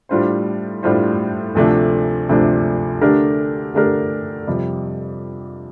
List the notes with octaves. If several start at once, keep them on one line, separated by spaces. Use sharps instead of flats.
A2 G3 D4 F4 C5
A2 G3 D4 F4 C5
D2 C3 F3 A3 D4
D2 C3 F3 A3 D4
D3 A3 D4 G4 A#4
D3 A3 D4 G4 A#4
F2 C3 G3